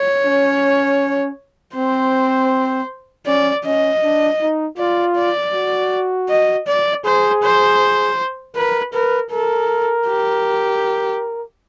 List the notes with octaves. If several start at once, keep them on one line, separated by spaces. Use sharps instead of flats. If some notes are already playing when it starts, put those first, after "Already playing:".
Already playing: C#5
C#4
C4 C5
C#4 D5
C#4 D#5
D4
D#4
F4 D5
D5
F#4
D#5
D5
G#4 C5
C5
A#4 B4
A#4 B4
A4 A#4
G4